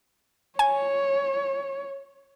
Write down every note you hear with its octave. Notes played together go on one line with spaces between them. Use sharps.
C#5 G#5